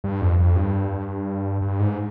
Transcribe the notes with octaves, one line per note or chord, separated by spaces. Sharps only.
G2
F2
F2
G2
G2
G#2